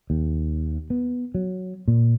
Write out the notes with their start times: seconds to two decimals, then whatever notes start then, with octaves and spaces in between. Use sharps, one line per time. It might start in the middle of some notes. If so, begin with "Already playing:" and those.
0.10 D#2
0.90 B3
1.35 F#3
1.88 A#2